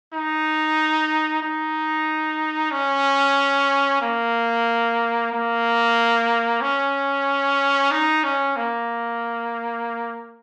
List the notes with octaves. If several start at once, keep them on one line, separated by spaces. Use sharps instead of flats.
D#4
D#4
C#4
A#3
A#3
C#4
D#4
C#4
A#3